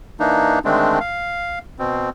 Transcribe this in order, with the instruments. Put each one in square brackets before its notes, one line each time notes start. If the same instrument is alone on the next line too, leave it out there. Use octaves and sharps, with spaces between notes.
[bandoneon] E3 A#3 D4 D#4
D3 D#3 G#3 A3 C4 D4
F5
B2 C4